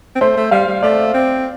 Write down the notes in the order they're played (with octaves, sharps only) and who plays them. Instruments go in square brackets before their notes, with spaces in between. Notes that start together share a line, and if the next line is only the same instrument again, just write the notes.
[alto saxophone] C4
[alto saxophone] A3 [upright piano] C5
[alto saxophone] A3
[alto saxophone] G3 [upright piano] F5
[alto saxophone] G3
[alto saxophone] A3 [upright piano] D5
[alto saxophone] C4